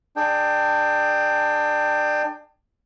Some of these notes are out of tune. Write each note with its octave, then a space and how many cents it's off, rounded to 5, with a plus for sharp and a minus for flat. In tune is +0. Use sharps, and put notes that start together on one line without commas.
D4 +25 G#4 +25 G5 +0